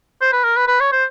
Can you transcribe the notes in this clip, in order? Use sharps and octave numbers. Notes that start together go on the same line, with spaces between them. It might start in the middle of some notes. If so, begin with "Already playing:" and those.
C5
B4
A#4
B4
B4
C#5
C5